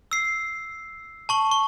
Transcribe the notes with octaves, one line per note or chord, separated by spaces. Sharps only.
E6 C7
A5 C#6 F#7
C#6